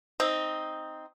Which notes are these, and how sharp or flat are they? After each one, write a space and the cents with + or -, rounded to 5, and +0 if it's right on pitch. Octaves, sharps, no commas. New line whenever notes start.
C4 +0 D#4 +5